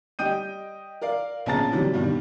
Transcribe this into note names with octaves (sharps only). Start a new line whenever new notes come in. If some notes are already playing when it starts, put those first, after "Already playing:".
G3 D#5 G5 D#6 G6 D#7
A#4 D5 F5
A#1 C#3 B3 A5 A#5 A6
C3 E3 F#3 G3
G2 B2 D#3 G3